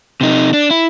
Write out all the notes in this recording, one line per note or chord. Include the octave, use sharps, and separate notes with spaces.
C3 D#4
D4
E4